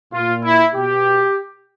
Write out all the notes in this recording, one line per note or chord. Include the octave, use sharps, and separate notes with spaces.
A#2 F4
E4
B2 G4